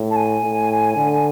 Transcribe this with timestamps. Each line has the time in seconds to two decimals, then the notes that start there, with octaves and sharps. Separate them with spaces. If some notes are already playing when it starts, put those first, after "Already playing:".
Already playing: A2
0.11 A5
0.16 G#5
0.44 A2
0.96 D3